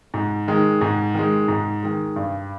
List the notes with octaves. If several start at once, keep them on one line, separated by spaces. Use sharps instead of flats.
G#2
D#3 G#3
G#2
D#3 G#3
G#2
D#3 G#3
G2